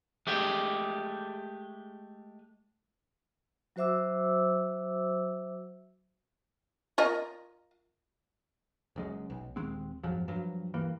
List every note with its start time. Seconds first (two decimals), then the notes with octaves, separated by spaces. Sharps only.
0.27 G#3 A3 G4
3.76 F#3 F#4 C5 E5 D6 E6
6.98 F4 A#4 D#5
8.96 F#1 F#2 G#3
9.30 B1
9.56 D#1 D#3 G#3 C4
10.03 F2 G#2 F3 F#3
10.28 G2 F3 F#3
10.74 G2 E3 A#3